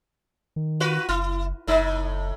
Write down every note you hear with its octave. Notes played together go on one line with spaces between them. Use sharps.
D#3
F4 F#4 B4
F#1 E4
F#1 A2 D#4